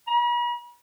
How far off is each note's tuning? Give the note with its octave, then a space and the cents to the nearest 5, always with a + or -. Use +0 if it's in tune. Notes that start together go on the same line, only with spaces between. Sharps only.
B5 -45